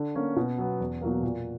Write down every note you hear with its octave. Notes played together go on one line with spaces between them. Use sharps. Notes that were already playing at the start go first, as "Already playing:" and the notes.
Already playing: D3
A#3 C#4
B2
F#3 B3
E2
B2 F#3 A#3
A#2